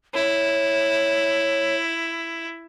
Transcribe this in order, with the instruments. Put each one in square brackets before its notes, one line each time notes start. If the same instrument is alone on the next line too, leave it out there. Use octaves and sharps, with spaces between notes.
[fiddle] E4 [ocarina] C#5